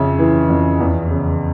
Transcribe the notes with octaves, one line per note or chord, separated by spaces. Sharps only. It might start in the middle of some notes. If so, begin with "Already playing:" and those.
Already playing: F2 C#3 E5
E3
F2
E2
C#3